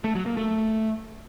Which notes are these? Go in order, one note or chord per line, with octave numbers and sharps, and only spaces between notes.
A3
F#3
A#3
A3